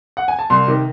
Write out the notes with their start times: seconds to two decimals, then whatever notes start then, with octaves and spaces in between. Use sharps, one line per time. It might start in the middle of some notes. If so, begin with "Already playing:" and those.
0.17 F#5
0.28 G#5
0.39 A5
0.50 C2 C6
0.67 C3 D#3